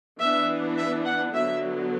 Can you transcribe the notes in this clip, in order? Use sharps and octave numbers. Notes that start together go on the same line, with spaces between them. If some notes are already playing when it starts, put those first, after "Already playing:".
E3 B3 D4 E5
E5
F#5
D3 F#3 B3 E5